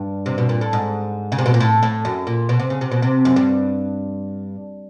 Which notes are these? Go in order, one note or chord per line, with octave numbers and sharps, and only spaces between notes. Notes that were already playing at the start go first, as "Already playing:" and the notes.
Already playing: G2
C3
B2
A#2
A2
G#2
C#3
C3
B2
A#2
A2
A2
F#2
A#2
B2
C3
C#3
C3
B2
C3
F#2
G2